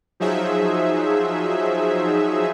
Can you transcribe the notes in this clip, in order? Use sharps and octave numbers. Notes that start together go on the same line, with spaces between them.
F3 F#3 D#4 G#4 E5